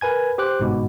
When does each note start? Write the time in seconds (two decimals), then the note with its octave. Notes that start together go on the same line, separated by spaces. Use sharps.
0.01 A#4 B4 G#5 G#6
0.38 G4 C5 D6 F#6
0.60 G1 G#2 B2